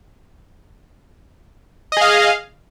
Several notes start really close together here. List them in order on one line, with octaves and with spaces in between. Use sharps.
D#5 G#4 F5